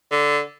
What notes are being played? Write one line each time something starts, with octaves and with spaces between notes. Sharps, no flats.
D3